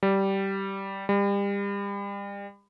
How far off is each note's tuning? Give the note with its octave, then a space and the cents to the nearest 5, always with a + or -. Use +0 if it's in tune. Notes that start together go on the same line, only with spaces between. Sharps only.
G3 -10
G3 +35